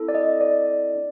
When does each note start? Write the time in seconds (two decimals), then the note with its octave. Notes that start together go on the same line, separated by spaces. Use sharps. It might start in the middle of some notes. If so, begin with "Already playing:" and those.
Already playing: C4 E4 A4
0.09 D5
0.15 D#5
0.41 D5
0.96 D4